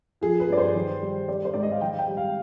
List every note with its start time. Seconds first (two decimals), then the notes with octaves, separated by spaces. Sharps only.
0.21 F3 G#4
0.40 B4
0.49 G2 D5
0.57 C5
0.75 D#3
1.01 G3
1.28 G3 D5
1.45 C5
1.54 G#2 D5
1.63 D#5
1.72 F5
1.81 D#3 G5
1.99 G5
2.08 G3
2.17 F5